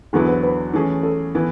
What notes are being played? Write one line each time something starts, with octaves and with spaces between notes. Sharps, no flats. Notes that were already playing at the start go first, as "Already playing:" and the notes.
E2 D3 F#3 B3 E4 G#4
B4
B4
E3 A3 C#4 G#4
A4
E3 B3 E4